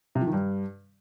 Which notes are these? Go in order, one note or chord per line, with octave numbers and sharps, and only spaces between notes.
C3
F3
D#3
G2